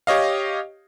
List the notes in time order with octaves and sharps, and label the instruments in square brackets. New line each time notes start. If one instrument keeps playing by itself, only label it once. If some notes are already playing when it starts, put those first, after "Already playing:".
[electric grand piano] G4 C#5 D#5 F5